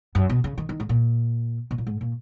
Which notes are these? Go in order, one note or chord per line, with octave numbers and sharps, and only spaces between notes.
F#2
B2
C#3
D#3
D#3
G#2
A#2
B2
A#2
G#2
A#2